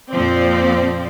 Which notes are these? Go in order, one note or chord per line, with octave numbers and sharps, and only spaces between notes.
F2 A#2 F3 C4 D5